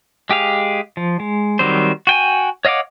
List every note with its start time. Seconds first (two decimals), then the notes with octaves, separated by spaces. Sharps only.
0.30 G#3 G4 G#4 F5
0.97 F3
1.20 G#3
1.59 D#3 F#3 G3 C4 C5
2.07 F#4 G5 G#5
2.65 C#5 D#5 F5 F#5 D6